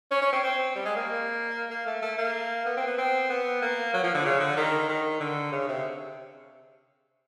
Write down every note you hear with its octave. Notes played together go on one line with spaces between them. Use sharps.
C#4
C#4
C4
C4
G3
G#3
A#3
A#3
A3
A3
A#3
B3
C4
B3
C4
B3
A#3
F#3
F3
D3
C#3
D3
D#3
D#3
D3
C#3
C3